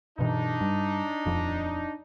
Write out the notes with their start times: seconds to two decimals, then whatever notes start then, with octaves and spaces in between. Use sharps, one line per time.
0.19 G2 B2 E3 D4 D#4
0.61 G2
1.25 D#1 F2 F3